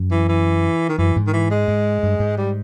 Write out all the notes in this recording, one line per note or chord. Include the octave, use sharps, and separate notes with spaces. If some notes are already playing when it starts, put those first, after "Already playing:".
Already playing: F#2
E3
E3
D#3
F#2 E3
G#2
D#3
E3
G#3
G#2
G2
G#2
G3